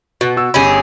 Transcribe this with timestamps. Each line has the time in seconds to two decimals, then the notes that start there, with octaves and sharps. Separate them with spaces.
0.21 B2 F#4
0.37 F#4 E6
0.54 G1 C#4 G4 G#4 B5